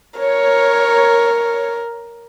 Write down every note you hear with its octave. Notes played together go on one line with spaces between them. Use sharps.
A#4 C#5